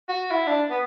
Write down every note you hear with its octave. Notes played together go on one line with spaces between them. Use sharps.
F#4
E4
D4
B3